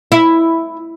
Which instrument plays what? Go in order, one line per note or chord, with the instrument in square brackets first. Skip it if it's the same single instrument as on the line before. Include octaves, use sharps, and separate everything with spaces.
[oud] E4